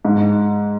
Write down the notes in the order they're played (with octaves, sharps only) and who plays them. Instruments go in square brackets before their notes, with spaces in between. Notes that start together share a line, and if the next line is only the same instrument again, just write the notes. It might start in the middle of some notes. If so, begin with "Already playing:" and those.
[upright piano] G#2